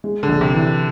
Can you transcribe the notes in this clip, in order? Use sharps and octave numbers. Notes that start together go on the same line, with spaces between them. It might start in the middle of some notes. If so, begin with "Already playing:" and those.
G#3
D3
A#1
C3
E3